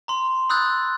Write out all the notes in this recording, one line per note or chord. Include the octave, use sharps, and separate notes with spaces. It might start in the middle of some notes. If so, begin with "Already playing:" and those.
A#5 C6
B5 D#6 E6 F#6 G6 A6